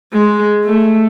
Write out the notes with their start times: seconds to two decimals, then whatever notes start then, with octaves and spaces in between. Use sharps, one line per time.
0.13 G#3
0.65 A3